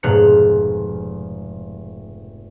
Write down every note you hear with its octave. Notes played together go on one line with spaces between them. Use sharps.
F1 G#2 B2 F6 F#6 C#7